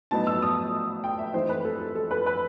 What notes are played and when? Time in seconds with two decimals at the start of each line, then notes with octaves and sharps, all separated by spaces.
0.11 A2 F#3 B3 D#4 A5
0.27 E6
0.42 D#6
1.04 G5
1.19 E5
1.34 E3 A3 C4 D#4 C5
1.49 B4
1.65 A4
1.80 A4
1.95 A4
2.11 B4
2.26 B4